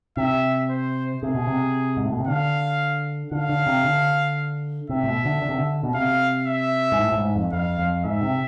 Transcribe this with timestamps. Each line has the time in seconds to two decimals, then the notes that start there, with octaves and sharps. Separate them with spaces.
0.17 C3 E5
0.70 C5
1.22 C3 G#4
1.35 B2
1.47 C3
1.97 G#2
2.05 A2
2.12 B2
2.19 C3
2.27 D3 F5
3.32 D3 F5
3.49 D3
3.67 C3
3.85 D3
4.89 C3 E5
5.03 A2
5.08 B2
5.25 D3
5.42 D3
5.49 C3
5.58 D3
5.83 B2
5.94 C3 F5
6.47 E5
6.92 G#2
7.00 A2
7.12 A2
7.17 G#2
7.35 F2
7.52 F2 F5
7.79 F2
8.05 G#2 E5
8.23 C3